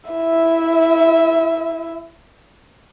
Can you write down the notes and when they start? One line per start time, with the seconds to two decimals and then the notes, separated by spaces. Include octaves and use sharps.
0.10 E4 E5